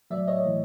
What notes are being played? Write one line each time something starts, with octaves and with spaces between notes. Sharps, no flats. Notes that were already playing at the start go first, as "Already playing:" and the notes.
A2 F#3 D5 E5
C#5 D#5
A2 E3